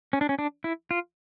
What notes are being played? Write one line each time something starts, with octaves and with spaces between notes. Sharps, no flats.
C#4
D4
C#4
D4
E4
F4